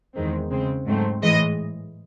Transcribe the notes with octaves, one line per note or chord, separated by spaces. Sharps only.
E2 D#3 G#3 C4
C#3 G#3 C4
G#2 F#3 A3 C4
A2 E3 G#3 D#5